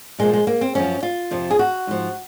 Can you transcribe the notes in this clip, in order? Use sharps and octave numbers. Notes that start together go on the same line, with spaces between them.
A#2 F3 G#3
G#3
A#3
C4
F#2 F3 C#4
F4
F2 C3 F3
G#4
F#4
G#2 F3